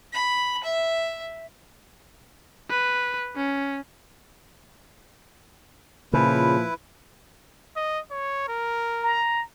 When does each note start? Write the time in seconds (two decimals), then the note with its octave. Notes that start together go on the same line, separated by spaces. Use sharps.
0.12 B5
0.63 E5
2.70 B4
3.36 C#4
6.13 A#2 C#3 F3 E4 B4
7.76 D#5
8.11 C#5
8.48 A#4
9.03 A#5